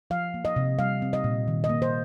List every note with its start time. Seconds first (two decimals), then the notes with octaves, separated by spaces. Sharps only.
0.10 F3 F5
0.34 A#3
0.45 D#5
0.56 C3
0.78 G3 F5
1.02 C4
1.13 D#5
1.24 A#2
1.48 D#3
1.64 D#5
1.69 A#3
1.82 C5